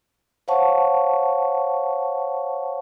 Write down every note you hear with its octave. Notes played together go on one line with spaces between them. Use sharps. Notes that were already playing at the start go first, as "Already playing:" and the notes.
C5 C#5 F5 F#5 A5 C#6